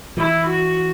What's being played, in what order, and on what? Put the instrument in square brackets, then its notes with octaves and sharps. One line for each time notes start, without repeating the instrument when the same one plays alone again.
[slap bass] E3 [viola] E4
[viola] F#4